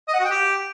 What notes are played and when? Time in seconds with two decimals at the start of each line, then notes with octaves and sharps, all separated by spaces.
0.08 D#5
0.14 F#5
0.19 F#4
0.25 G5
0.30 G4